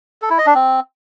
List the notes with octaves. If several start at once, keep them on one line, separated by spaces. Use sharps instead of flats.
A4
E4
D#5
D4
C4